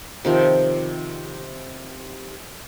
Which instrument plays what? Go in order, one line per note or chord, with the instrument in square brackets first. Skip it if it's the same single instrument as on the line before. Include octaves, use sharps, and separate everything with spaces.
[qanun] C3 D#3 F3